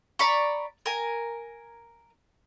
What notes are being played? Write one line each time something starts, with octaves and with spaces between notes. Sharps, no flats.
D5 A#5 B5 C#6
A#4 G#5